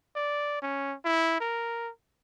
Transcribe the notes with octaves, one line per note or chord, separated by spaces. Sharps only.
D5
C#4
E4
A#4